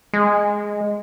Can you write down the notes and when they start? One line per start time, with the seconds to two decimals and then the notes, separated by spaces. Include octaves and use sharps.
0.14 G#3